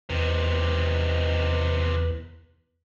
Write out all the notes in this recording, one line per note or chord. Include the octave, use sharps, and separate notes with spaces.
E2 C3 D#3 B4